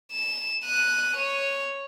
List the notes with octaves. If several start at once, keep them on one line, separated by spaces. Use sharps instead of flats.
E7
F#6 D#7
C#5